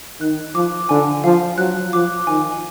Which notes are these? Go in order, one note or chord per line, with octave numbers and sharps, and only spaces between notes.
D#3 F#6
F3 D6
D3 G#5
F3 F5
F#3 F#6
F3 D6
D#3 G#5